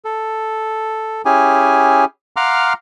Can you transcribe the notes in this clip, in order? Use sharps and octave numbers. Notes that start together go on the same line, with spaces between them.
A4
C#4 E4 G4 G#4 G#5
F5 F#5 A#5 C6 D6 F6